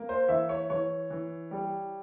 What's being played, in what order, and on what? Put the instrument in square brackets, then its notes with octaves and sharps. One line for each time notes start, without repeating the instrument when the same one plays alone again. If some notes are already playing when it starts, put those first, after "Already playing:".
Already playing: [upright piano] A#3
C5
E3 E5
C#5
E3 C#5
E3
G3